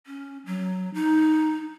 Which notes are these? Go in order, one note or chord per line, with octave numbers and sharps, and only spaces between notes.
C#4
F#3
D#4